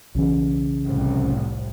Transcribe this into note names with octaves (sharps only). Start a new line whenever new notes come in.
B1 C#3 E3
F1 C2 A2